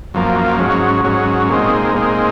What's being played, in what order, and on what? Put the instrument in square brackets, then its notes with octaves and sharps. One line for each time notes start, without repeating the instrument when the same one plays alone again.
[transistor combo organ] F#2 F3 A#3
G#2 F#3 C#4
G#2 F#3 C#4
A#2 G#3 C4 D#4
A#2 G#3 C4 D#4